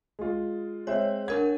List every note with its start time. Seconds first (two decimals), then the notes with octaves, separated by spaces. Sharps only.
0.19 G#3 F4
0.87 G#3 C4 C#5 E5
1.28 D4 A#4 F#5 G#6